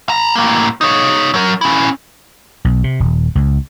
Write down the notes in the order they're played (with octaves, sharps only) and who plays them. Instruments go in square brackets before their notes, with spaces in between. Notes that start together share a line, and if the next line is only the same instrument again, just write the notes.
[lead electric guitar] A5 A#5
A2 A#3
D#4 C#5
F#3 A#4
C#4 E4
[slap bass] B1
C3
D#1
C#2